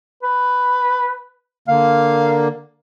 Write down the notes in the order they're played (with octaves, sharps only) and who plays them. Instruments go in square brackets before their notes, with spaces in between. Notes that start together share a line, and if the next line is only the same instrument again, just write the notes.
[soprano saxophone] B4
[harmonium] D3 A#3 [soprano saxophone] F5